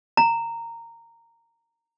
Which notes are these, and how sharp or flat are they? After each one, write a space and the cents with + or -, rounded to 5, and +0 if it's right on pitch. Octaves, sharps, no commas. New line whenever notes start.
A#5 -15